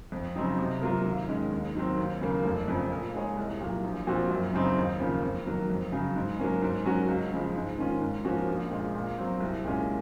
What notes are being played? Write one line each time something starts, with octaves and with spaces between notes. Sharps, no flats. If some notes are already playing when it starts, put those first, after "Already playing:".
F2
C#3 F#3 C4 D#4
C3
F#3 A#3 F4 A#4
D#2
D#3 G#3 C#4
D#2
D#3 F#3 C4
D#2
C#3 F#3 A#3
F1
F2 C#3 F3
A#2
G#3 D#4 G#4 C#5
C2
A#2 F#3
A#1
A#2 F3 C4 F#4
F#2
C#3 F#3 C4 D#4
D#2
C#3 F3 A#3
F2
D#3 F#3 A#3
F2
C#3 F#3
G#2
F#3 A#3 C#4
G#2
F#3 C#4 F#4 A#4
C#2
C#3 F3 G#3
G#2
D#3 A#3 C#4 F4
G#2
F3 A#3 C#4 F#4
A#1
A#2 G#3
A#2
F#3 C4
C2
A#2 G#3 C#4